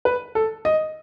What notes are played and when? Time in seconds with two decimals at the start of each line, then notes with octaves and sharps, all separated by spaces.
0.05 B4
0.35 A4
0.65 D#5